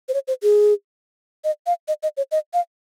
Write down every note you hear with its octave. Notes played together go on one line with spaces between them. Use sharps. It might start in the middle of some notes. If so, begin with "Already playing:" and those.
C5
C#5
C5
G#4
D#5
F5
D#5
D#5
C#5
D#5
F5